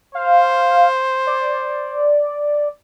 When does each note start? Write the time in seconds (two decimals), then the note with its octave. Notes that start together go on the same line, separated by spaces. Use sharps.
0.15 C5 F5
1.27 D5